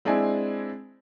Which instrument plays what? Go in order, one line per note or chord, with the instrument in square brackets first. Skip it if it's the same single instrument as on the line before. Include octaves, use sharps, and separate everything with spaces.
[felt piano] G#3 C4 D4 E4 G#5